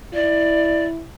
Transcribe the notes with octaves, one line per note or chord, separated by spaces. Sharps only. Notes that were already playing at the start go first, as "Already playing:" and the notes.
E4 D5